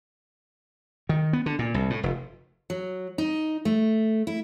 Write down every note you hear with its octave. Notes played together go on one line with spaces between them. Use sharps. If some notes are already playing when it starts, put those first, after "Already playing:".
D#3
B3
D3
A#2
C2
A2
F1
F#3
D#4
A3
E4